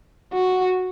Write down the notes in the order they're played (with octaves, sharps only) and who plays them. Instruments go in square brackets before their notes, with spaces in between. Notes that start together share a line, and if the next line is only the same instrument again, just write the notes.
[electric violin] F#4